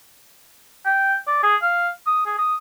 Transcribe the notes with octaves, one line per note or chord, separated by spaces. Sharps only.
G5
D5
G#4
F5
D#6
G#4
D#6